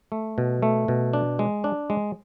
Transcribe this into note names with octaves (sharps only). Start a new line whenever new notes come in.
A3
B2
A3
B2
D4
G#3
D4
G#3